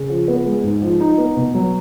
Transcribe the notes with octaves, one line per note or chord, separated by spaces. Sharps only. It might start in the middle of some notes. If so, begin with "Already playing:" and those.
Already playing: C#3
F3
B3
G#3
G#2
F3
D#4
B3
B2
F#3